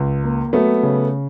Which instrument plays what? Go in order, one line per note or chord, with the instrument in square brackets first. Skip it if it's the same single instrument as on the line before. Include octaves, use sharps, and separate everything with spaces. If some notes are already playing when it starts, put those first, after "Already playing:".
Already playing: [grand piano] C#2
A#3
[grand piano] F#3 [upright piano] A3 B3
[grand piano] C#3